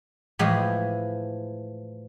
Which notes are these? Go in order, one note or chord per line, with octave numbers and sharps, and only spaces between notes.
A2 E3 F3 G#3 B5